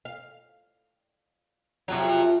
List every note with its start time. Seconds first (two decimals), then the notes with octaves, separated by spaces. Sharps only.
0.05 F5
1.88 F2 C3 F#3 F4 F#4